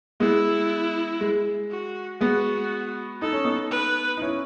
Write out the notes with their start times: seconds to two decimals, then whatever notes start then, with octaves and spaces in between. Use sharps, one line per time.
0.20 G#3 B3 E4
1.21 G#3
1.71 F#4
2.20 G#3 B3 F#4
3.21 D#4 A4
3.33 C#4
3.45 B3 D#4
3.71 B4
4.17 D#4
4.22 C#4 E4